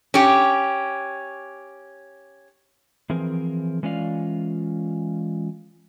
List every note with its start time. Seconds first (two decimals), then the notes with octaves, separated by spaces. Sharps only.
0.14 C#4 G4
3.10 E3 F3 C4 G#4 A#4
3.83 E3 G#3 C#4 F4 D5 F5